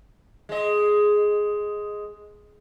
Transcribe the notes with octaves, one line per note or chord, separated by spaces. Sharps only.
G#3 D#5